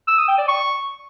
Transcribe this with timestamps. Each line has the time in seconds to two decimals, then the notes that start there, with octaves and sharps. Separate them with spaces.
0.08 E6
0.18 D#6
0.28 G5
0.38 D5
0.48 C#6